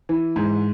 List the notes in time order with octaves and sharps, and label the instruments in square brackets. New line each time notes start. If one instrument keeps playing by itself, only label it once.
[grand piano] E3
G#2